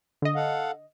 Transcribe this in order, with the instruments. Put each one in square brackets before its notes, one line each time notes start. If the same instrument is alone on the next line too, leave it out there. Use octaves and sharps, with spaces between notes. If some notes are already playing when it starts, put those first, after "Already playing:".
[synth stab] D3 D#5
[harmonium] A4 F5 F#5